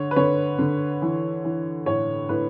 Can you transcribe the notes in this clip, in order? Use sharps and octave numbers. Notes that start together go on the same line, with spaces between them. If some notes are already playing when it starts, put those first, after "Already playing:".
Already playing: D3 C#5
B4
D3 C#5
D3
E3
E3
A2 C#5
A2 B4